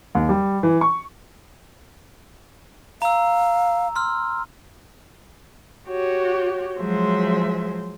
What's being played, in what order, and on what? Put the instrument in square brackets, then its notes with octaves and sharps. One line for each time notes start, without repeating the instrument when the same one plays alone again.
[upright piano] D#2
G3
E3
C#6
[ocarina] F5 [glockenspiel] A#5 E6
[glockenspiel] C6 E6 F6
[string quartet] F#4 G4 C#5
F3 F#3 G#3 C5 E5